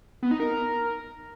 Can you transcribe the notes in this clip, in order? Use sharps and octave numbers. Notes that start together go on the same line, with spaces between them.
B3
D#4
A#4